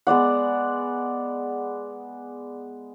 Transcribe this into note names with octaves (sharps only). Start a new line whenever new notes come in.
G#3 B3 D5 F#5